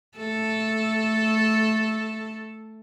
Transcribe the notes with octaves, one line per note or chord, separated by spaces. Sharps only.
A3 A4